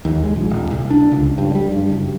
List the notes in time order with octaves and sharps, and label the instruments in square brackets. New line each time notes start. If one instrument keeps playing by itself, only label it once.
[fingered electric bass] D#2
G#3
A#1
D#1
C2
D4
C#2
G2
G3
G2
F#1